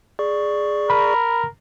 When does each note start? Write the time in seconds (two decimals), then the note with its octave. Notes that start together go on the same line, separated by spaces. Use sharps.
0.19 G#4 D5 C#6
0.90 A#4 B5